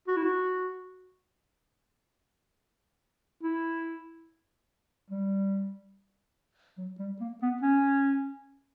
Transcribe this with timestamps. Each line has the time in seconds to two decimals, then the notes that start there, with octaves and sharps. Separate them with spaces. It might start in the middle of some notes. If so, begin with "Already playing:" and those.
0.08 F#4
0.17 E4
0.25 F#4
3.43 E4
5.10 G3
6.78 F#3
6.99 G3
7.21 A#3
7.42 B3
7.62 C#4